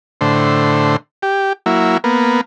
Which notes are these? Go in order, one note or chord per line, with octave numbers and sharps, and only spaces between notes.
A2 D3 C5
G4
F#3 A#3 E4
A#3 B3